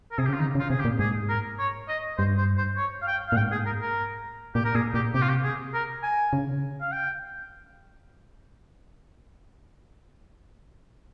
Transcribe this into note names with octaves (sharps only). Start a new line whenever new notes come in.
A#4
C3 G#4
G4
C#3 F4
D#3 D#4
C#3
F4
C3 G#4
G4
A#2
G#2 G#4
A#4
C#5
D#5
G2 C5
C5
C5
C#5
F5
G5
F5
A#2
G#2 G5
G#4
A#4
A#4
A#2 G4
A#4
A#2 G#4
A#2 G4
C3 G4
F4
G4
G#4
A#4
G#5
C#3
F5
G5